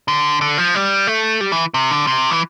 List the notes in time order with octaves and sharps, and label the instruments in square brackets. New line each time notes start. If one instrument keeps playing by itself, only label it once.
[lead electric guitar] D3
D3
F3
G3
A3
G3
E3
C3
D3
C3
E3